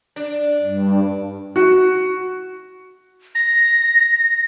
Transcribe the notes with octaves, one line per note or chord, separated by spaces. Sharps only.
D4
G2
F#4
A#6